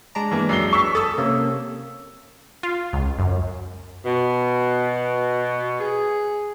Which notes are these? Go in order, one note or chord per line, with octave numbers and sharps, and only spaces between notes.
G#3 D4 A#5
E3 A#3
F#2 C7 G7
C#6 E6 B6
A4 D#6 E6
C3 A#3 C#4
F4
C#2
F#2
B2
G#4